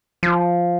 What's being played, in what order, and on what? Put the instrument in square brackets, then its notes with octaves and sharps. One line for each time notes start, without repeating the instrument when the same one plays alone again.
[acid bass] F3